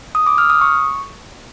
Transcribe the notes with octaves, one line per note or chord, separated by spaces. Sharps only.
D#6
D6
F6
D#6
C#6